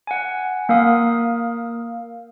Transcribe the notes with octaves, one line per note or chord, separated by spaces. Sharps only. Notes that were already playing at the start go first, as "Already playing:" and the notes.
F#5 G#5
A#3 A#4 F5 D#6